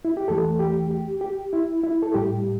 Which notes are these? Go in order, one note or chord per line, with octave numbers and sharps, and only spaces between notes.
E4
G4
E2 E3 A3 A4
G4
G4
G4
E4
E4
A4
A2 G3 G4